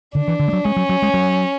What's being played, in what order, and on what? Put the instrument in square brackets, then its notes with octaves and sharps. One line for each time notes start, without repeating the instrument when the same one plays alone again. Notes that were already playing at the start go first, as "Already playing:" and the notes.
[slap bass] D3 [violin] D4
[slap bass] E3
D3
G#3
F#3
[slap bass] G#3 [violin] C#4
[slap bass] F#3
F#3
G#3
F#3